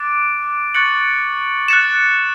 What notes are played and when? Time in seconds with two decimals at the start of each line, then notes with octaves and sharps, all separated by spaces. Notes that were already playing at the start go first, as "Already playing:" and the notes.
Already playing: D6 F#6 A6 D7
0.74 C#6 F#6 A6 C#7 F#7
1.68 F#6 A6 C#7 E7